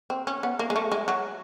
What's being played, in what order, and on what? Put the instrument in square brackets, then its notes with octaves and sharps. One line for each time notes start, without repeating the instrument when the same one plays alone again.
[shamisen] C4
C#4
B3
A#3
G#3
A3
G#3
F#3